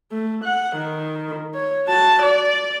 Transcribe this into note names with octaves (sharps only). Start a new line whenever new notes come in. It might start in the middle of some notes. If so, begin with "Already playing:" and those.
A3
F#5
D#3
C#5
F#4 A5
D5